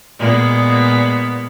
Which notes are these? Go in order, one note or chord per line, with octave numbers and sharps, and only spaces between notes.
A#2 G#3 B3